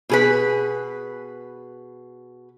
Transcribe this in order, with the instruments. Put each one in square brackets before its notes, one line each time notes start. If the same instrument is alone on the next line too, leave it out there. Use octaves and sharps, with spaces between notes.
[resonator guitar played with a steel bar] B2 G#4 B4